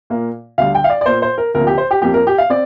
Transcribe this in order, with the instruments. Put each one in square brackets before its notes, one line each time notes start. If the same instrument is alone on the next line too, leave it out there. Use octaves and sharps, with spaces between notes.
[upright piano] A#2 A#3
D2 D3 G3 F5
G5
F5
D5
D5
A#2 A#3 C5
C5
A#4
D2 C3 F3 A#3 A#4
G4
C5
G4
F2 F3 A#3 G4
A#4
G4
F5
C4 D5